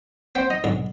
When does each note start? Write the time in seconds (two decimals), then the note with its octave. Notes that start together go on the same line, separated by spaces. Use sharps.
0.35 B3 C4 C5 G5
0.50 D#4 D#5
0.64 B1 G#2 D3 D#5